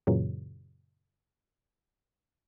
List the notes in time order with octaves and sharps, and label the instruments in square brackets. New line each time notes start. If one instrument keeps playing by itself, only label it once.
[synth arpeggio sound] F#2 A#2 C#3 E3 F#3